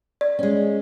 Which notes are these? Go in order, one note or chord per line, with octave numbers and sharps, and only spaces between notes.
D5
G#3 C#4